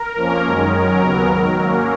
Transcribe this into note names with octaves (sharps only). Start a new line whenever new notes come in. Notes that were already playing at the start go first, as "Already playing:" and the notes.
Already playing: A#4
F2 F3 A#3 C#4
F#2 D#3 G#3 C#4
F#2 D#3 F#3 C#4 A#4
D#2 C#3 F#3 B3
G#2 D#3 F#3
G#2 F#3 A#3 C#4